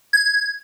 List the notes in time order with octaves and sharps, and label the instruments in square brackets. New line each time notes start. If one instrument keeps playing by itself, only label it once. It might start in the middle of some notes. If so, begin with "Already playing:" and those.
[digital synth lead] G#6